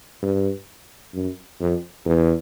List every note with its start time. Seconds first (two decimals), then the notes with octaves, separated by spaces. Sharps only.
0.23 G2
1.14 F#2
1.60 F2
2.06 E2